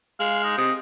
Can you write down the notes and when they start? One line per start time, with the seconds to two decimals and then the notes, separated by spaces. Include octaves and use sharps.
0.20 G#3 F5
0.44 D#4
0.57 C3 D#5